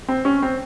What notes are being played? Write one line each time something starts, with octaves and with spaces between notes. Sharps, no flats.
C4
C#4
C4